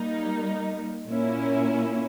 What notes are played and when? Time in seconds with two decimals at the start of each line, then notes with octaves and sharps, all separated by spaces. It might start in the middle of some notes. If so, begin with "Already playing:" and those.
Already playing: G3 A#3 D#4
1.07 A#2 A#3 C#4 E4